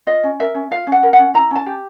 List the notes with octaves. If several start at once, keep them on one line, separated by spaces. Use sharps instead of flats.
F4 D#5
C#4
A#4 E5
C#4
F4 F5
C#4
F#5
A#4
F#5
C#4
E4 A#5
C#4 A5
G4